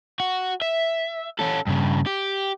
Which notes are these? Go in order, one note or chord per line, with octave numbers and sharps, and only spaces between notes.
F#4
E5
C#4 A4
G2 C#3
G4